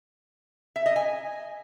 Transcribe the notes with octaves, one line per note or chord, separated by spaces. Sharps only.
E5
D#5
G#5